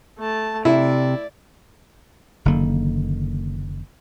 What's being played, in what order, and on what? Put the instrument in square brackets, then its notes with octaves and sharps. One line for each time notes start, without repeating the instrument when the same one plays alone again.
[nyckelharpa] A3 A5
[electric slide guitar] C3 [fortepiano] E4 [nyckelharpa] D5
[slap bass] F#1 D3 D#3 A#3